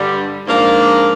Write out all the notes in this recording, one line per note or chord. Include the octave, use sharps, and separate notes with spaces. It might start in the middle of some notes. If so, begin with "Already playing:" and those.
Already playing: G2 D3 G3
G#2 F3 A#3 D4